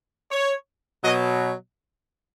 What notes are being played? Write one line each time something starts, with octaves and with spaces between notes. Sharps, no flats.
C#5
B2 F#3 D#5